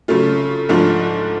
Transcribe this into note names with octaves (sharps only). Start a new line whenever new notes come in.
C#3 F#3 A3 F4
G#2 F3 A3 D4 F4